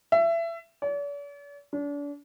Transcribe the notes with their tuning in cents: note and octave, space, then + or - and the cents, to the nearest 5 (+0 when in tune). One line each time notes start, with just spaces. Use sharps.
E5 +25
D5 -45
D4 -35